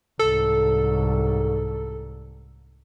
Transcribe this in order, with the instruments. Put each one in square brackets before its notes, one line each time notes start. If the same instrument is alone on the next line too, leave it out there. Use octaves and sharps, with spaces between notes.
[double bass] C2 G#2 [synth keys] A4